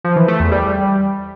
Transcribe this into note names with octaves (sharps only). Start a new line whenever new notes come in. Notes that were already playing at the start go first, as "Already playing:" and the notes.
F3
E3
A3
E2
G3